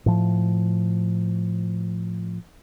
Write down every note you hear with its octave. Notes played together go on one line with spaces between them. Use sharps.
A2 F3